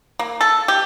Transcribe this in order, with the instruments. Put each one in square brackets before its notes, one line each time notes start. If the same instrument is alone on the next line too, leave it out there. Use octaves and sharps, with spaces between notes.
[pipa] A#3
A4
G4